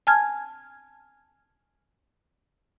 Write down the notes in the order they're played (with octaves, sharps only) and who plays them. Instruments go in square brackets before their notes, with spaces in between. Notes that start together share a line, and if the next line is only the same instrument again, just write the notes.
[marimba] G#5 A5 F6 G#6